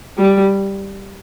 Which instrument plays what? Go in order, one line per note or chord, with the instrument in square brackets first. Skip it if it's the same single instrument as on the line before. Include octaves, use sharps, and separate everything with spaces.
[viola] G3